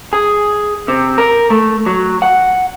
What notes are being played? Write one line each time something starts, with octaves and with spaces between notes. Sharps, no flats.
G#4
C3
A#4
A3
F#3
F#5